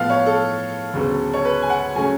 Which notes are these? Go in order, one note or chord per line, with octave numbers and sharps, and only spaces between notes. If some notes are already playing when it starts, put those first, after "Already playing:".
Already playing: A2 F3 B3 F5
C#5
A4
D2 C#3 F#3 B3
C#5
B4
G#5
F#5
C#3 F#3 A3 C#4 G#5